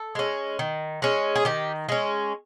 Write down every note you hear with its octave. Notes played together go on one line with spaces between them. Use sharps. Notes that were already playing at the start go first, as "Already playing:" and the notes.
Already playing: A4
G#3 C#4
D#3
G#3 C#4
G#4
D#3 G4
G#3 C#4